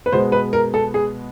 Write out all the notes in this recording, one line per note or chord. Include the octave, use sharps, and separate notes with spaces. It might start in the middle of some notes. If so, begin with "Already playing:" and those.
B4
B2 G#3 B3 C5
B4
A#4
A4
G#4